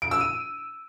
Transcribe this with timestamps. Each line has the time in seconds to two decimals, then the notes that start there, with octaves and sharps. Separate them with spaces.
0.02 D7
0.11 E6
0.21 D#7